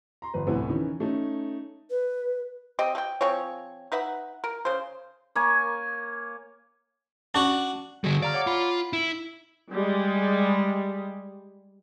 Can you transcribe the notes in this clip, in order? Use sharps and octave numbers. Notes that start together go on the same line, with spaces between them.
A#5 C6
G1 G2 B4
D2 A2 C3 E3 A3 B3
D#3 E3 C#4
A3 C#4 D#4
B4
C4 G4 D#5
A3 G5
F3 C4 G#4 C#5
D#4 B4 E5 F#5
A#4
C#3 C5
A#3 C#5 G#5
C#4 D4 F#4 C#6
D3 G3 F#4 G#4 A4
D5 F5 A#5 F6
C#5 F#5 D6
F4 B5
E4
G3 G#3